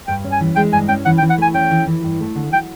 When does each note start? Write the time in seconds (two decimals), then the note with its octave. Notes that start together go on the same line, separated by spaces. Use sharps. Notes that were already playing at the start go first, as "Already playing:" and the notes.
0.07 G2 G5
0.24 C#4
0.32 G#5
0.40 E3
0.56 G#3 G5
0.72 G2 G#5
0.88 C#4 G5
1.05 E3 F#5
1.18 G5
1.22 E3
1.30 F#5
1.38 A3 G#5
1.54 C#4 G5
1.71 E3
1.87 E3
2.04 G2
2.20 A3
2.35 D3
2.53 F#3 G5